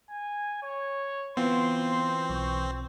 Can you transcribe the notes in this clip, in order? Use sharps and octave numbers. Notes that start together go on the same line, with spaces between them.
G#5
C#5
E3 B3 C4 F4 C6
B1 C#6